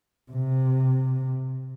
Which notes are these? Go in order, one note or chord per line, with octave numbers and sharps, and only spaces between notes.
C3